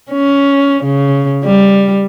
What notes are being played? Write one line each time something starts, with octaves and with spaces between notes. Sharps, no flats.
C#4
C#3
G3